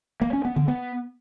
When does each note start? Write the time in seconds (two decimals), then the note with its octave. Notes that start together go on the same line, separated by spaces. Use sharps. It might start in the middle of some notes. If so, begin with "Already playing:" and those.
0.21 A#3
0.33 C#4
0.45 B3
0.56 D3
0.68 B3